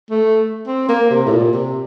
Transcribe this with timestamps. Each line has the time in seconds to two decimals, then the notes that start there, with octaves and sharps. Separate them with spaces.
0.11 A3
0.67 C4
0.89 A#3
1.10 C3
1.26 A2
1.32 A#2
1.53 C3